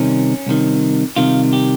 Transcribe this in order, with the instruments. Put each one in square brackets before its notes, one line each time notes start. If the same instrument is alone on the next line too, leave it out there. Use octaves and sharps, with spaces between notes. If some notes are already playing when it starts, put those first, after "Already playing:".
Already playing: [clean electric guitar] C2 C3 D#3 C#4
C2 C3 D#3
C2 C3 D#3 F4
G4